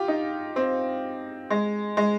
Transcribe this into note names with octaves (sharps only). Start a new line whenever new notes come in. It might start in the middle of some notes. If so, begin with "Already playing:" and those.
Already playing: F4 G4
D#4
C4
G#3
G#3